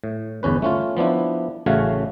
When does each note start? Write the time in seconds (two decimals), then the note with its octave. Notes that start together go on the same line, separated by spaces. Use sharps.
0.04 A2
0.43 G1 E2 C#4 B4
0.62 A3 C#4 F4
0.97 F3 B3 D4 E4
1.66 A1 C#3 A3 F#4 C#5 F5